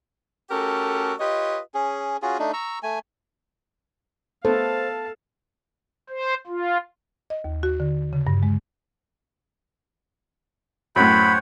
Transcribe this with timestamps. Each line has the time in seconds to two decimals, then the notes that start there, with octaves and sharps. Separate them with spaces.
0.50 A3 C#4 F#4 G4 A4 A#4
1.19 F4 G4 B4 C#5 D#5
1.74 C#4 G#4
2.22 C#4 F4 F#4 G#4
2.39 A3 D4 D#4
2.53 A#5 C#6 E6
2.83 A3 G#5
4.45 A3 B3 A4 C5 F5 A5
6.09 C5
6.47 F4
7.30 D#5
7.44 D#2
7.63 F#4
7.80 D3
8.13 C#3
8.27 G2
8.43 G#3
10.96 F#2 A2 C5 C#5 F#5 B5